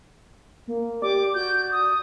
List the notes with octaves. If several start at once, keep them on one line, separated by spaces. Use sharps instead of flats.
A#3
G4 D5 D6
F#4 G6
D#6